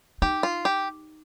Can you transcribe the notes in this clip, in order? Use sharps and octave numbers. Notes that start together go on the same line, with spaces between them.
D#4 G4
F4
G4